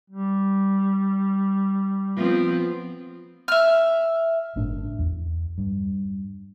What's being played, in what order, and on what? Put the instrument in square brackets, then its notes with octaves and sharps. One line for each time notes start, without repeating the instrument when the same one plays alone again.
[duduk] G3
[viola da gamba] F3 B3 C4
[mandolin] E5 F6
[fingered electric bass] G1 A2 D4
E2
G2